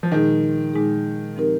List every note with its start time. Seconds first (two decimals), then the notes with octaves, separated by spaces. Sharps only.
0.03 F3
0.11 A#2 D#3 G#3 D#4 G#4
0.74 A#2 G#3 D#4 G#4
1.36 F3 C4 D#4 G4 A#4